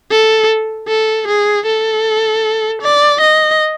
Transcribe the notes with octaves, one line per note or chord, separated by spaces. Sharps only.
A4
A4
G#4
A4
D5
D#5